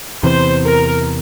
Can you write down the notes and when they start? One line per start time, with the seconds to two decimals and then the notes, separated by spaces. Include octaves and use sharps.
0.23 E2 C3 E3 C5
0.63 A#4